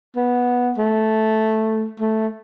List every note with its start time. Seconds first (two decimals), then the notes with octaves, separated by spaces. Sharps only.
0.16 B3
0.78 A3
2.00 A3